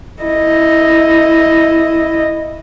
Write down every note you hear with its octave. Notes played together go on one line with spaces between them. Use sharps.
E4 D#5